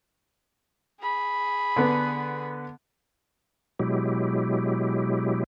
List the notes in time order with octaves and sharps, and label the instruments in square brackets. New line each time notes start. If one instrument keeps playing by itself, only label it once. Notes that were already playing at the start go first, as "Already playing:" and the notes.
[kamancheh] G#4 B5
[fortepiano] D3 B3
[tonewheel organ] B2 F#3 G#3 E4 G4